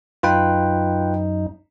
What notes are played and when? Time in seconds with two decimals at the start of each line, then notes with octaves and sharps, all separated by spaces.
0.23 F#2 D#4 F4 B4 G5